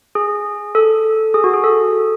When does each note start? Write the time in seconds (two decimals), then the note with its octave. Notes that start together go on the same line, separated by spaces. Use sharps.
0.15 G#4
0.75 A4
1.34 G#4
1.44 F#4
1.54 G#4
1.64 A4